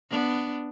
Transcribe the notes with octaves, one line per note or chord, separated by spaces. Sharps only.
B3 D4